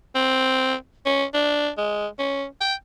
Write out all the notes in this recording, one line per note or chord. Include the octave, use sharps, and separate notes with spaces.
C4
C#4
D4
G#3
C#4
G5